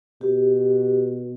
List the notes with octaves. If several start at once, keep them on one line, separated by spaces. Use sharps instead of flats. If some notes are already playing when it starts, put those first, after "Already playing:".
B2 G4